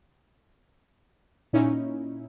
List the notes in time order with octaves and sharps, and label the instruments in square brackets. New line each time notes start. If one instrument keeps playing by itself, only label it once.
[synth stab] A#2 C#4 D#4 E4